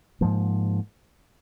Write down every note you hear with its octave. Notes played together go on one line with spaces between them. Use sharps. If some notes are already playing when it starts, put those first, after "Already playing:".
G#2 F3 A#3